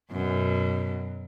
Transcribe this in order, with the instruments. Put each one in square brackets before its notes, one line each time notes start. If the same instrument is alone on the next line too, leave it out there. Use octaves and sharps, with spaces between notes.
[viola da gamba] F#2 B2